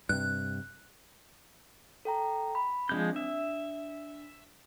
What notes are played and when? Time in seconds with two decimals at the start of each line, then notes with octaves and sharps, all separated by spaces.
0.09 G2 C3 F#6
2.05 A4 G5 A#5
2.55 B5
2.89 F3 G#3 C4 D4 G6
3.16 D4 E5